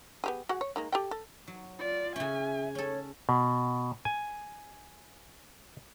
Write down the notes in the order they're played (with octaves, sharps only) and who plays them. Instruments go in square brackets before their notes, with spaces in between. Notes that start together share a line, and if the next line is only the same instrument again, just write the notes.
[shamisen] B3 G4 G#4
F#4 G#4 F#5
C#5
D#3 G#3 A#3
G4 A4 G5
A4
[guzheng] F#3
[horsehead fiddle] F4 D5
[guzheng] C#3 C#4 [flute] E5 [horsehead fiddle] G#5
[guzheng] C#4 A4 [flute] C#5
[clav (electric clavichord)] B2
G#5